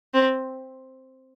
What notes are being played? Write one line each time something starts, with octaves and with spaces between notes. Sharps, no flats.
C4